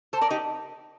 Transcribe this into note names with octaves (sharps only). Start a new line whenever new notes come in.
A4 C5
A#4 D5
D#4 G4